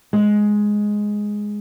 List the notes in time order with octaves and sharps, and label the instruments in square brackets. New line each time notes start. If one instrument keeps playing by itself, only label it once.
[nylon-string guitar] G#3